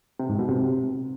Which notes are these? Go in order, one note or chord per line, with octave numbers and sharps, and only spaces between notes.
C3
G#2
B2
C3